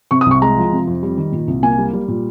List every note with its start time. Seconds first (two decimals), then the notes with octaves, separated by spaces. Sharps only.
0.11 C3 C#6
0.21 D#6
0.26 C2 C#6
0.42 G#3 A#5
0.57 F3
0.72 C3
0.87 F2
1.03 G3
1.17 D#3
1.32 A#2
1.48 C2
1.63 A#3 G#5
1.78 G3
1.93 G3
2.08 A#2